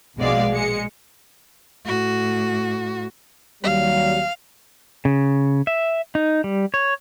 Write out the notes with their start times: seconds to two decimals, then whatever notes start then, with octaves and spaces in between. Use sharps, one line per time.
0.17 A#1 B2 G#3 D5 F5
0.52 G#3 C#7
1.86 A2 F#4
3.64 D#2 F#3 G3 F5
5.05 C#3
5.67 E5
6.15 D#4
6.44 G3
6.74 C#5